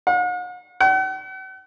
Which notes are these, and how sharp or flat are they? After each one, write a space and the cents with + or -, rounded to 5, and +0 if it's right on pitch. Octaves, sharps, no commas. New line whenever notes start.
F#5 -45
F#5 +45